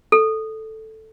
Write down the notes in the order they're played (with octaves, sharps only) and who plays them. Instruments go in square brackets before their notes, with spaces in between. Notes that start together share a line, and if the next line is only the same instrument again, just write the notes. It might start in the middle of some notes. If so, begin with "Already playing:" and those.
[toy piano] A4